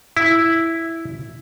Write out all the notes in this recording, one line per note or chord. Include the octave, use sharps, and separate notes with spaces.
E4